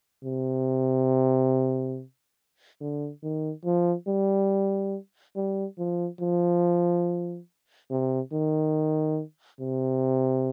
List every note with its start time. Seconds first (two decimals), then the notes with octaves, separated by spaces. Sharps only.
0.24 C3
2.81 D3
3.22 D#3
3.65 F3
4.07 G3
5.36 G3
5.78 F3
6.20 F3
7.91 C3
8.33 D#3
9.60 C3